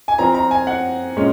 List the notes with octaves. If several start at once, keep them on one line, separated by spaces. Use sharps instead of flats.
G#5
F3 C4 A#5
A#5
G#5
F#5
A#2 G#3 C#4